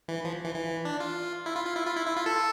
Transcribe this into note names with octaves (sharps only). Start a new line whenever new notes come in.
E3
F3
E3
E3
D4
F4
E4
F4
F4
E4
F4
E4
E4
F4
A4